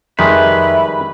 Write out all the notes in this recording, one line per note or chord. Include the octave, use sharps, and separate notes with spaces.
F2 D#3 G3 G#3 B4 E5